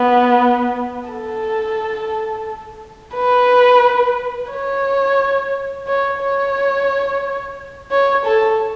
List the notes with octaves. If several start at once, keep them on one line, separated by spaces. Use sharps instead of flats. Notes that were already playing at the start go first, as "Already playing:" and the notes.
Already playing: B3
A4
B4
C#5
C#5
C#5
C#5
A4